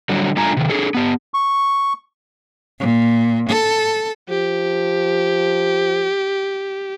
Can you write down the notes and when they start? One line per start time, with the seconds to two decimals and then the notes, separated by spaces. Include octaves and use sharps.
0.09 D3 F#3 G3
0.37 G3 A3 D4 F4 G#5 A#5
0.57 C3 D#3
0.70 D4 G#4 A4
0.95 B3 G4
1.34 C#6
2.79 A#2
3.49 A4
4.29 F3 G4